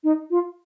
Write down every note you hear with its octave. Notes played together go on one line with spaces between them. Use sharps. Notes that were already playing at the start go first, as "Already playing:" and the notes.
D#4
F4